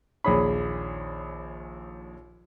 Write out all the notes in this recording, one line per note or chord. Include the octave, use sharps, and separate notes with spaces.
A#1 D#2 G#4 C#5 B5